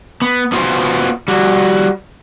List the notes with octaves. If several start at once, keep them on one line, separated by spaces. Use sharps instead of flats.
B3
B3 F4 F#4 C5
G3 F#4